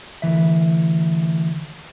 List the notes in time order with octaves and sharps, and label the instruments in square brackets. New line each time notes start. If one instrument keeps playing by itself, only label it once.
[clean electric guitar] D2 C#3 E3 E5